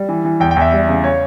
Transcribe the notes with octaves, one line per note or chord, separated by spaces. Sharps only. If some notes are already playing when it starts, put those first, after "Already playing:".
Already playing: G3
E3
E3
E2 G5
G5
E2
E5
G3
C#3
C#5